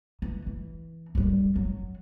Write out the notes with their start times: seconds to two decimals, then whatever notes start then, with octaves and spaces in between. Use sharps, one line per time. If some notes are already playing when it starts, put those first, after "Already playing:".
0.22 E3
0.46 E3
1.15 F#2 G3
1.56 F#3